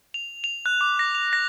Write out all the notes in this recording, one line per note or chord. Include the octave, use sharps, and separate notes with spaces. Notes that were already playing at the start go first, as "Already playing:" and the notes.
F7
F7
F#6
D6
A#6
F7
A#6